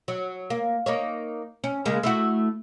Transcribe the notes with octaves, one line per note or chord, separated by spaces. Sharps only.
F#3
A#3
A#3 D#4 C#5
C#4
C#3 G#3 A#3
A3 E4 F#4